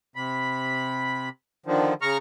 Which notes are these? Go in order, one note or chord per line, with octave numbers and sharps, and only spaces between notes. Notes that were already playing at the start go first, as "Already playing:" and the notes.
C3 B5
D3 D#3 F3
C#3 A#5 C#6 F6